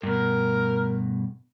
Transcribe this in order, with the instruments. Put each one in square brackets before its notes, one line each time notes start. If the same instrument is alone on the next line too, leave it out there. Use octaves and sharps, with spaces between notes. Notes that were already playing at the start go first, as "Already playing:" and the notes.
[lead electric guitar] G2 B2 [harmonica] A#4